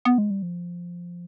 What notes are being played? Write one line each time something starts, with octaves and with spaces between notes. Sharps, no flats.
B3
G#3
G3
F3